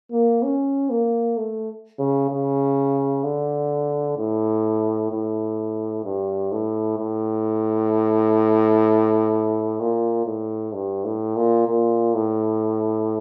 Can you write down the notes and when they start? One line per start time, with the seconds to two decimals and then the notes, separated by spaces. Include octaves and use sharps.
0.12 A#3
0.43 C#4
0.90 A#3
1.37 A3
1.99 C#3
2.31 C#3
3.24 D3
4.18 A2
5.12 A2
6.05 G2
6.52 A2
6.99 A2
9.80 A#2
10.26 A2
10.74 G2
11.05 A2
11.36 A#2
11.67 A#2
12.14 A2